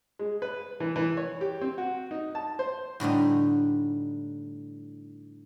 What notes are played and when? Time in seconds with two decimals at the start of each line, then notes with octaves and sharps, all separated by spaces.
0.19 G#3
0.42 B4
0.80 E3
0.96 E3
1.17 C#5
1.41 G4
1.61 C4
1.78 F#4
2.11 D#4
2.35 A5
2.59 C5
3.00 A2 D3 G3 D#4